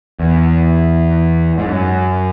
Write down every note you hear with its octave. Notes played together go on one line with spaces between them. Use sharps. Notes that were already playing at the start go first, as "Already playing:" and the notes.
E2
G#2
F#2